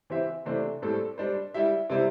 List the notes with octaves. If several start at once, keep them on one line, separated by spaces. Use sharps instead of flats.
E3 C4 G4 C5 E5
C3 E3 A3 D4 C5
A2 G3 C4 A4 C5
G3 D4 C5
G3 E4 G4 E5
C3 G3 E4 C5